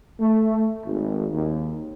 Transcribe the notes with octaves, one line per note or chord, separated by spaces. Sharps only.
A3
G#1
D#2